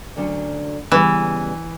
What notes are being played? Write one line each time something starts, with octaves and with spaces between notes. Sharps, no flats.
D2 D3 F#3 C#4
C#3 E3 G3 B3